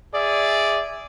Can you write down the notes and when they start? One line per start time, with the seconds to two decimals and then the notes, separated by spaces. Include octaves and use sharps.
0.14 G#4 D5 E5